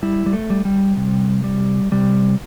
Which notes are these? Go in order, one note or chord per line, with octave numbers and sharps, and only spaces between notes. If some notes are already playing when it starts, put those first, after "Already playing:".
G3 E4
G3
A3
G3
G3
C3
G3
C3 G3